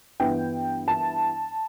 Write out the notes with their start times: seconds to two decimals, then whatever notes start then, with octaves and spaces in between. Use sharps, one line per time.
0.20 G2 E3 B3 E4 G5
0.88 A5